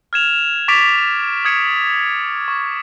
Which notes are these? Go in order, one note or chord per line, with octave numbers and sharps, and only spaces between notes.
F6 G#6 E7 F7
C#6 D6 A6 B6 D7 F7
D#6 G#6 C#7 D7 E7
C#6